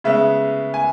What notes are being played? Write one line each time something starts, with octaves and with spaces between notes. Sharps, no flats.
C#3 G#3 B3 E5
G#5